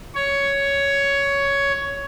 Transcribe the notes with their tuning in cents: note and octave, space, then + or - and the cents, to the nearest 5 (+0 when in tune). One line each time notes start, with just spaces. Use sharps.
C#5 +10